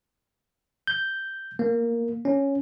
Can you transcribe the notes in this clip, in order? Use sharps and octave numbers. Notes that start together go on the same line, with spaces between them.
G6
A#3
C#4